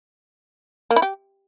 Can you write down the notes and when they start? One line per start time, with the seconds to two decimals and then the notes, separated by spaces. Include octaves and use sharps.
0.91 A#3
0.96 E4
1.02 G4